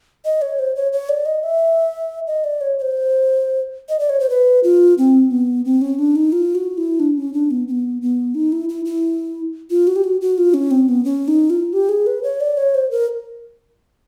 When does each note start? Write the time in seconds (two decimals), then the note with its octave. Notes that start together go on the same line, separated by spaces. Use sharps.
0.25 D#5
0.42 C#5
0.59 C5
0.76 C#5
0.93 C#5
1.09 D5
1.26 D#5
1.43 E5
2.27 D#5
2.44 D5
2.61 C#5
2.78 C#5
2.82 C5
3.89 D#5
3.99 D5
4.09 C#5
4.20 C5
4.30 B4
4.64 F4
4.98 C4
5.31 B3
5.65 C4
5.81 C#4
5.99 D4
6.16 D#4
6.32 F4
6.55 F#4
6.78 E4
7.00 D4
7.18 C#4
7.34 D4
7.51 B3
7.68 C4
7.71 B3
8.02 B3
8.35 D#4
8.52 E4
8.69 E4
8.85 E4
9.70 F4
9.87 F#4
9.96 G4
10.04 F#4
10.21 F#4
10.38 F4
10.54 C#4
10.71 C4
10.89 B3
11.05 C#4
11.28 D#4
11.50 F4
11.73 G4
11.89 G#4
12.07 B4
12.23 C#5
12.41 D5
12.57 C#5
12.75 C5
12.91 A#4